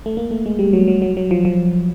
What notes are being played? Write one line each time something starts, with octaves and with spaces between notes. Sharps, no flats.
A3
A#3
A3
G#3
G3
F#3
F#3
F#3
F#3
F3
F3